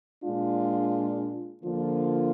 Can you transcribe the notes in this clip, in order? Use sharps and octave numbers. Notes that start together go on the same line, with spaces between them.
A#2 G#3 D4 F4
D3 F3 A#3 F4